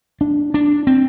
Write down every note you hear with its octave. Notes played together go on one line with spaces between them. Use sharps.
D4
D4
C4